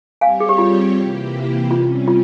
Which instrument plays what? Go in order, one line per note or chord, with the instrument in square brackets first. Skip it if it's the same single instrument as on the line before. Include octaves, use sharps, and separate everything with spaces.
[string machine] G3 C4 G4 C#5 [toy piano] F5 G#5
[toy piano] G#4
G4
F4
[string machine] C3 E3 A#3 E4 G4
[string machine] C3 G3 C#4 [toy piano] F4
[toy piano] F4